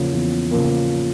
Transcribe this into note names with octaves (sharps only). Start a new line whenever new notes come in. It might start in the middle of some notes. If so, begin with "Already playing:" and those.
Already playing: E2 C#3 F3 A#3
E2
C#3 F3 A#3